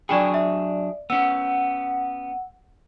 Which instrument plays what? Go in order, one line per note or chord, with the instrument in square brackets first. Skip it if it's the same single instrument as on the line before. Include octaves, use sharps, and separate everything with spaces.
[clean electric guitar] F#3 D4 G#4 [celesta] D5 G5 [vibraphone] B5 C#6
[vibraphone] D5 [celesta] E5
[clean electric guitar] B3 C#4 [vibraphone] F#5 [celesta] E6